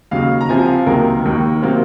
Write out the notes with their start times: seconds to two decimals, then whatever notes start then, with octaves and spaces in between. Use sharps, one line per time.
0.11 D#2 C#3 F#3 F5
0.41 A#5
0.49 C2 C3 F3 G#5
0.68 F5
0.86 C#2 C3 D#3 F#3 A#3 A#4
1.24 D#2 D#3 A#3
1.62 C3 F#3 A#3 C4